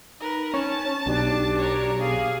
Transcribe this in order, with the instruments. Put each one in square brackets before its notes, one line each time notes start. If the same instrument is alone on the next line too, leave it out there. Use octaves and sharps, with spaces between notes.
[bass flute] D#4 [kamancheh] A#4 B4
[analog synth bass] C#4 [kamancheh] A5
[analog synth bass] B1 [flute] D4 [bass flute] G4
[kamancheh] A#4 C#5
[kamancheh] G#4 [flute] F5